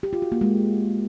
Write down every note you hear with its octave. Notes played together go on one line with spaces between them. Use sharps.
G4
F4
F#4
A#3
G#3